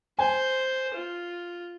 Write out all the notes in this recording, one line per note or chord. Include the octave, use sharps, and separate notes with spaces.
C5 G#5
F4